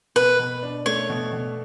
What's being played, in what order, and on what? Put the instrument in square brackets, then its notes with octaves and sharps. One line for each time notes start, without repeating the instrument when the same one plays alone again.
[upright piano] B2 [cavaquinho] B4
[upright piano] B2
D4
[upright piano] A3 [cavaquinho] C#5
[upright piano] B2
B2